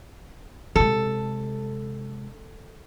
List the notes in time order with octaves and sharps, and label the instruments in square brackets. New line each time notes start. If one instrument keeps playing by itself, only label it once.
[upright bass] C3 G#3 [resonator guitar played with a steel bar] A4